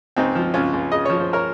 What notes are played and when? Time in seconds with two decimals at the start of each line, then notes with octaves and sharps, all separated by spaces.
0.16 C#2 C4 D#4
0.35 F3
0.54 C#2 C#4 F4
0.73 C#2
0.92 C#3 D#5
1.05 F3 C#5
1.20 C5
1.33 A#4 C#5